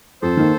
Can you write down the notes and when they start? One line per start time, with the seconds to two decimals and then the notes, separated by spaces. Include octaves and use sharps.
0.22 F2 A4 C5
0.37 D#3 A#3 D#4